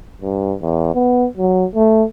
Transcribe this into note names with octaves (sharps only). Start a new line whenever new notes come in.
G2
E2
B3
F#3
A3